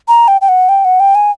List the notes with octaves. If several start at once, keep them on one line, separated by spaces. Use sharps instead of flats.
A#5
G5
G5
F#5
G5
F#5
G5
G#5